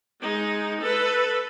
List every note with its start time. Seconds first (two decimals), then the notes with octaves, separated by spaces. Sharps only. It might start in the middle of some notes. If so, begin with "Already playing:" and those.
0.20 G#3 D#4
0.81 A4 B4